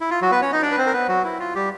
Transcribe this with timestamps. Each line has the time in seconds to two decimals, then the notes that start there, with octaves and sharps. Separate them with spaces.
0.01 E4
0.11 F4
0.22 F#3 F#4
0.31 B3 B4
0.42 C#4 C#5
0.52 D#4 D#5
0.62 D4 D5
0.71 B4
0.78 C4 C5
0.87 A#4
0.93 B3 B4
1.09 F#3 F#4
1.24 E4
1.40 F4
1.55 G3 G4